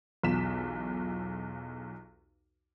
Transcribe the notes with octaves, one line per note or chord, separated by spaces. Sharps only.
B1 E2 F4 B6 E7